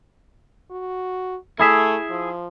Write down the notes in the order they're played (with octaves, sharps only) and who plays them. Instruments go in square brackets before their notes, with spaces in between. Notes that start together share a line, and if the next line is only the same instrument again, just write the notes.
[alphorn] F#4
[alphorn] A3 [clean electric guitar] E4 G#4 E5
[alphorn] F3